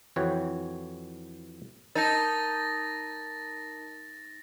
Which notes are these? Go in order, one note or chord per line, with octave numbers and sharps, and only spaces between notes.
F2 E3 F#4 C#5 G5
D#4 A#4 A5 A6 A#6